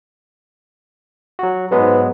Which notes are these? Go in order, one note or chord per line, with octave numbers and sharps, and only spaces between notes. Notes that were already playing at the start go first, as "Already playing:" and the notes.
F#3 F#4
G#2 F#3 G#3 B3 B4